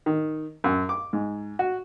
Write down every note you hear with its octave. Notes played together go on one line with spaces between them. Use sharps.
D#3
F#2
D6
G#2
F#4